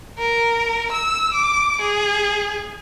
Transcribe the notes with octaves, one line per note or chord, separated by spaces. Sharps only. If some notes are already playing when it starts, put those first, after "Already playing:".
A#4
E6
D6
G#4